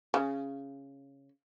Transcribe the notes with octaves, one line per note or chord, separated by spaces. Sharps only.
C#3